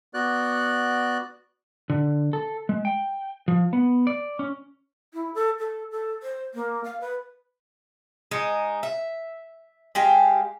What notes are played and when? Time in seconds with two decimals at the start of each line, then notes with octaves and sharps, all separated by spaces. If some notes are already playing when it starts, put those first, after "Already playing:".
0.14 B3 F#4 D5 F#6
1.90 D3
2.33 A4
2.69 G#3
2.85 G5
3.48 F3
3.73 B3
4.07 D5
4.39 C#4
5.14 E4
5.35 A4
5.59 A4
5.91 A4
6.23 C5
6.54 A#3
6.84 F5
7.01 B4
8.31 G#3 D#4
8.83 E5
9.95 G#3 G4 F5